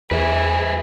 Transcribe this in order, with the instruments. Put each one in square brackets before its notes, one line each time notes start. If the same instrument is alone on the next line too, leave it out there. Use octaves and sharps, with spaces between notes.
[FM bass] E2 [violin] G#4 [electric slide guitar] B4 C5 E5